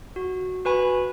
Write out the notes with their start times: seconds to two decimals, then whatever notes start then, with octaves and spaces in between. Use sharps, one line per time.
0.16 F#4
0.65 F#4 B4 G#5 B5